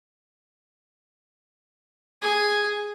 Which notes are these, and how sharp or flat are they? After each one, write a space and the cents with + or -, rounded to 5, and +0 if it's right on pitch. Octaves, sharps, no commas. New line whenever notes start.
G#4 +0 G#5 +0